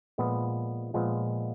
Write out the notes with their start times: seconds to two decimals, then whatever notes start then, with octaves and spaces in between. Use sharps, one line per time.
0.18 A#2 F3 G#3 B3
0.94 A#2 F3 G#3 B3